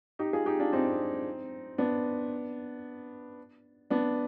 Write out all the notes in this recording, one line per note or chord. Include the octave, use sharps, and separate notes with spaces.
D#4 G4
F4 G#4
D#4 G4
D4 F4
C4 D#4
B3 D4
B3 D4